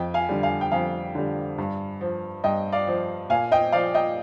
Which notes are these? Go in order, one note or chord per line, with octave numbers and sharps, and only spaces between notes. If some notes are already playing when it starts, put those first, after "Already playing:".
Already playing: F2 D#5 G5
F5 G#5
D3 G3
F5 G#5
G5
F2 F5 G#5
D3 G3
G2
F3
G2 D#5 G5
D5 F5
F3
A#2 F5 G#5
D#5 G5
F3 D5 F5
D#5 G5